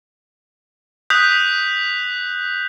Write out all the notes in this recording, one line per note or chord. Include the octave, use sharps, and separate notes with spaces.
D#6 F#6 G6 B6 F7